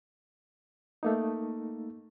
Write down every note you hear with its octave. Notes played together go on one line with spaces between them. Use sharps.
A3 A#3 D#4